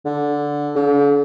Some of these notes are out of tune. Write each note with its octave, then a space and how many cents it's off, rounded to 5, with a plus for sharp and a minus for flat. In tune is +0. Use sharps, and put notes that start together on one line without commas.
D3 -10
D3 -45